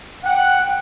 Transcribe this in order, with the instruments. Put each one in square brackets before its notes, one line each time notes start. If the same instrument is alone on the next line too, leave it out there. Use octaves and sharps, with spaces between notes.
[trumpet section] F#5 [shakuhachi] G5